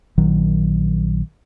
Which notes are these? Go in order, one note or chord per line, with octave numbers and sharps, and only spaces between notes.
A#1 D#3 F#3